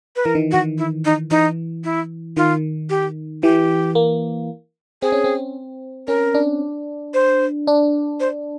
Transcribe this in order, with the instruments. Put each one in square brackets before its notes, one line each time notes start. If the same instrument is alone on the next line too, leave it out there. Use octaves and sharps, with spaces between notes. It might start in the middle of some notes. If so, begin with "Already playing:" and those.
[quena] B4
[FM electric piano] E3 [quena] A#4
[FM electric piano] D#3
[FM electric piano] D#3 [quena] F#4
[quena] E4
D#4
[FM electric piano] E3 [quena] D#4
[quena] E4
[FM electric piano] D#3 [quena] F4
[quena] G4
[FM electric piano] E3 [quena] G4
[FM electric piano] A#3
[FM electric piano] C4 [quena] G#4
[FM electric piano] C#4
C4
[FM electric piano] C#4 [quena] A#4
[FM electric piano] D4
[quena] C5
[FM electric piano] D4
[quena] C5